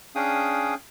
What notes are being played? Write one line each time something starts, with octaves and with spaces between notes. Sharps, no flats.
C#4 D4 G#4 F5 G5 D#6